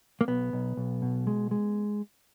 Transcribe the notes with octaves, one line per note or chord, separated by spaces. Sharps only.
A#3
B1 B3
B1
B1
B2
G#3
G#3